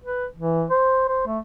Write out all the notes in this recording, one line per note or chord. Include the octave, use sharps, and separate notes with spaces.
B4
E3
C5
C5
A3